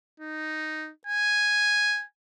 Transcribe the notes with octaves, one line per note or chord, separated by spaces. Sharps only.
D#4
G#5